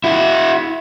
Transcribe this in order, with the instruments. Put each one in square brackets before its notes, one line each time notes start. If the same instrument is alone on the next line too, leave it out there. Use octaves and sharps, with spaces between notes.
[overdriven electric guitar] E4 F#4